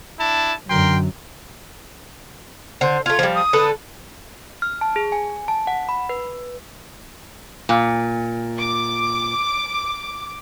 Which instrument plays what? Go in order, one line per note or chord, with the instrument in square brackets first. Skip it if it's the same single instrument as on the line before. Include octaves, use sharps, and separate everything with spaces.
[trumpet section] D4 E4 A5
[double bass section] F#2 D3 F#3 [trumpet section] A#4 G5 C6
[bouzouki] D3 [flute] C5
[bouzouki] A3 F4 [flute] G#6
[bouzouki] F3 G3
[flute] D#6
[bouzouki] D3 A4 B4
[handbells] F6
A5
G#4
G#5
A5
F#5
B5
B4
[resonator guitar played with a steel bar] A#2
[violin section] D6